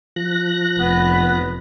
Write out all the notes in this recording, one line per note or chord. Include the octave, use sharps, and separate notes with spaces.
F3 F#6 A#6
F1 B3 B4